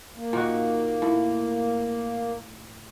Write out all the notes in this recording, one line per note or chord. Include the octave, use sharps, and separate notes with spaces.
A#3
A#2 D#3 F#4
A2